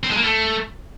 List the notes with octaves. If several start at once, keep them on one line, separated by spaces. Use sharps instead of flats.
C4
G#3
A#3
A3